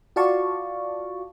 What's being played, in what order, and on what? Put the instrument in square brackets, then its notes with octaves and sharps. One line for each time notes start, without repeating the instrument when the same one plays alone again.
[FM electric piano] F4 F#4 D5 F5 A5 C#6